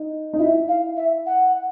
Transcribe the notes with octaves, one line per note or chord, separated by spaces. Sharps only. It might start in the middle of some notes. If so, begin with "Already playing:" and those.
Already playing: D#4
D#4
E4 E5
F5
E5
F#5